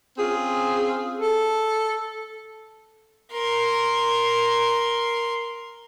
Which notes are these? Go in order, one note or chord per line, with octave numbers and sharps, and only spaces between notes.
C4 C#4 F4 G#4
A4
A#4 C6